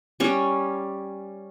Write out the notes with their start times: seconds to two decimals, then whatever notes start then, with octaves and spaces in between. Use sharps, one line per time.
0.20 G3 C#4